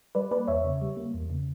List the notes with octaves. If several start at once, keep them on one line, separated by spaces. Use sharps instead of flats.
G3 B4 D5
A#3 B4 D5
E2 C#5 E5
C#3
G3
A#3
E2
C#3